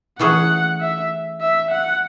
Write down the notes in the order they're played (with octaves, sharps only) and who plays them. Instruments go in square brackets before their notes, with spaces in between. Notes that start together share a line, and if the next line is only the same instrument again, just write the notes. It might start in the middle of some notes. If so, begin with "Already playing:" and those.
[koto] E3 A3 C#4 G#4 [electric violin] F#5
[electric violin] E5
E5
F#5